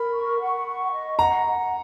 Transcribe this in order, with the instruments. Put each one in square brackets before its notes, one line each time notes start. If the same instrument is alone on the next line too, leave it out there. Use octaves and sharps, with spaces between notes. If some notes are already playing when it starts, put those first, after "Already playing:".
Already playing: [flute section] A#4 [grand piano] B5
[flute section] C#6
F#5
C#6
D#5
[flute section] F#5 [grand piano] A#5
[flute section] F#5